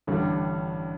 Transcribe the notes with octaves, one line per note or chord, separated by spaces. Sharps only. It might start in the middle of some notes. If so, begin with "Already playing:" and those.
A1 G2 D3 G3